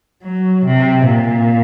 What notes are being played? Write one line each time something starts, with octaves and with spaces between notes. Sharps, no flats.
F#3
C3
A#2